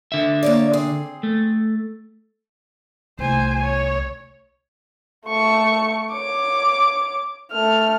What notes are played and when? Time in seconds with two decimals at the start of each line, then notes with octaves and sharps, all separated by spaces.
0.12 D3 E5
0.43 A#3 C#5 D5
0.73 C4 G#4
1.23 A3
3.19 C2 A3 C5 G#5
3.63 C#5
5.28 A3 C#6
6.13 C#5 D6
7.52 A3 F6